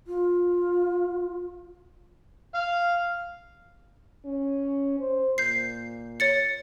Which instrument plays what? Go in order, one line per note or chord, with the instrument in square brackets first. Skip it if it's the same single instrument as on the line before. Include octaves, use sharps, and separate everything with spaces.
[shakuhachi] F4
[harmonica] F5
[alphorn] C#4
C5
[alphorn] A#2 [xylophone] G6 C7
[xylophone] C#5 A6 C#7